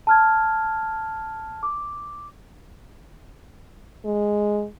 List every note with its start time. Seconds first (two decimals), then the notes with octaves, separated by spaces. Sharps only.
0.07 A5 F6 G#6
1.63 D6
4.05 G#3